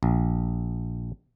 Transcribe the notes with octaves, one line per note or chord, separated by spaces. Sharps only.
A#1